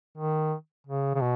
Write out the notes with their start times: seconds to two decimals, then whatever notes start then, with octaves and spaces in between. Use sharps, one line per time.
0.17 D#3
0.87 C#3
1.14 C#3
1.21 B2